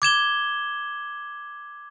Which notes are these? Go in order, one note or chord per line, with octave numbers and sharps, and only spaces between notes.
D6 G#6 E7 G7